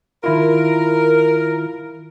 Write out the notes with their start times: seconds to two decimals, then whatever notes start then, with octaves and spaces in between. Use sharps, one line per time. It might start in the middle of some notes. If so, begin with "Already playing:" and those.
0.24 D#3 E4 F4 A#4